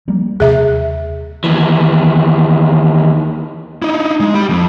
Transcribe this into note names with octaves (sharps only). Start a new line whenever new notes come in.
F3 G3 A#3
D#2 C3 G#4 E5
D#2 E3
D#4 E4
G#3
G4 B5
F2